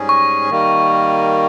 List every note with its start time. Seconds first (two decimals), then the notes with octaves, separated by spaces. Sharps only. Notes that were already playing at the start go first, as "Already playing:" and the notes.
Already playing: G#2 G3 C#4 G#4
0.09 C#6
0.50 D#3 G3 A#3